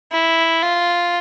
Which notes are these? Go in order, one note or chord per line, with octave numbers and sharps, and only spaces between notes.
E4
F4